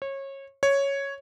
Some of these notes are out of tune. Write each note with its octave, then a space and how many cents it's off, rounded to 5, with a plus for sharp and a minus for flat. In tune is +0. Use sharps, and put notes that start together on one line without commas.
C#5 -25
C#5 +0